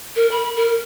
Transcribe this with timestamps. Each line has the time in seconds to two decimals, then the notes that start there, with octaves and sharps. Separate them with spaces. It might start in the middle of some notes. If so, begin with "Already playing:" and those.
0.16 A#4
0.31 B5
0.56 A#4